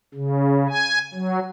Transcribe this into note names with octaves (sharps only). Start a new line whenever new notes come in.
C#3
G#5
F#3